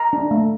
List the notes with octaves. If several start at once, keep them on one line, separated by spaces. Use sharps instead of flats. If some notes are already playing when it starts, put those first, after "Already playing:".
Already playing: A#5
D4
A3